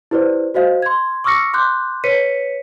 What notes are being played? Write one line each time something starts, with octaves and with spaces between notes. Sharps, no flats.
E4 G4 B4 C5 D5
F#4 C5 D#5 F5
C6 G#6
C#6 D6 E6 F6 A#6 C#7
C6 D6 F#6 G6
B4 C#5 B6 C#7 D#7